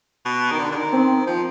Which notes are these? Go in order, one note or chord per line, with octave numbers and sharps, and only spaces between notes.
B2
D#3
D3
D3
D#3
C4
F3